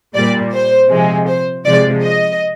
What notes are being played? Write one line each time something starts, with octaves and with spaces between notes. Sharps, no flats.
A#2 G3 D5
C5
C3 F3 G#3
C5
C3 F3 G#3 D5
D#5